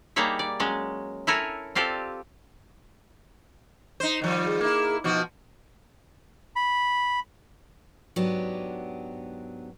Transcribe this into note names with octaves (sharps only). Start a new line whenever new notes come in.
G3 A#3 D#4 G#4 C#5 E5
D5
F#3 G#3 C#4
E4 A4 A#4 C#5 G#5
C4 F4 G4 A4 D5
D#4 C5
D#3 F3 G3
G#4
A#3 E4
B2 F3 D#4 F#4
B5
G#2 F#3 B3 D4 G4